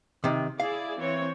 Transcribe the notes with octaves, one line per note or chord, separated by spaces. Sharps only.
C3 D#3
E4 G#4 D5 F5
E3 C4 C#5